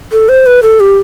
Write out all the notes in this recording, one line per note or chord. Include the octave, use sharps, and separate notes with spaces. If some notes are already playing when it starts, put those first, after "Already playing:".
A4
C5
B4
A4
G4